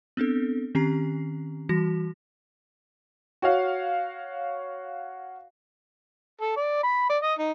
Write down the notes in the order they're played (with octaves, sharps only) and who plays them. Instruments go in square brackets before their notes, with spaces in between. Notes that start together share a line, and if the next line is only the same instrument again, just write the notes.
[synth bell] B3 C4 D4 A4
D#3 C4 C#4 G4 A#5 C7
E3 G3 F#4 A#6
[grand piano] F#4 C#5 F5
[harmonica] A4
D5
B5
D5
D#5
D#4